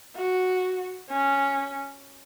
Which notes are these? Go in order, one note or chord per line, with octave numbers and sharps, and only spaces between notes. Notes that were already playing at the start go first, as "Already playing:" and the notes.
F#4
C#4